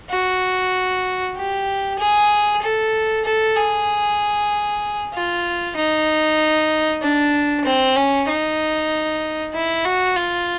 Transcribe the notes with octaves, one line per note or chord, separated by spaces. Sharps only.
F#4
G4
G#4
A4
A4
G#4
F4
D#4
D4
C4
C#4
D#4
E4
F#4
F4